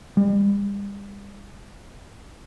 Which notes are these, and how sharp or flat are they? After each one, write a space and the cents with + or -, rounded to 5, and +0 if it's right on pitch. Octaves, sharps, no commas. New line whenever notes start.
G3 +40